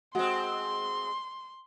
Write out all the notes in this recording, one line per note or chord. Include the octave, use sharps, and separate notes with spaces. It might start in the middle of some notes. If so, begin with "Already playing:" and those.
G#3 C4 F#4 C6